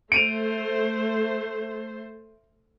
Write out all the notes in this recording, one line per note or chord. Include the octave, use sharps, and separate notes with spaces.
A3 C5 D7 D#7 F7